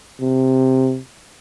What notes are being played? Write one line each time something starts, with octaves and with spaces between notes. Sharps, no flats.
C3